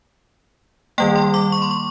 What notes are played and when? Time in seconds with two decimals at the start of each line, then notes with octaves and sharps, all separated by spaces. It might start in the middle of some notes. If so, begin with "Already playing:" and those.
0.98 D#3 G3 A#3 G5
1.16 C6
1.34 D6
1.52 C#6
1.62 C6
1.71 C#6